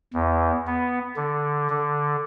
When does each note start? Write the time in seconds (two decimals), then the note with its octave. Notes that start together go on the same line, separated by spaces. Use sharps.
0.13 E2
0.67 B3
1.16 D3
1.70 D3